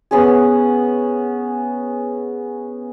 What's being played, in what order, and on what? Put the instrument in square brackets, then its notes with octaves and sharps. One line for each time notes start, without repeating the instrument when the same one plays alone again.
[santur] B3 C#4 G#4